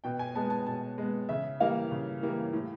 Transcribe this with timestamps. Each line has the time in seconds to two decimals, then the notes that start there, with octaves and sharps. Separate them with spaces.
0.04 B2 G5
0.19 G#5
0.35 G#3 B3 A5
0.50 A5
0.67 B2 A5
0.98 G#3 B3
1.29 C#3 E5
1.60 E3 G3 A#3 F5
1.91 C#3
2.22 E3 G3 A#3
2.53 A2